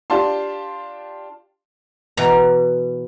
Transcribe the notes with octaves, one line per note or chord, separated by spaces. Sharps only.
D4 F4 G4 A5 C6
B2 E3 A#5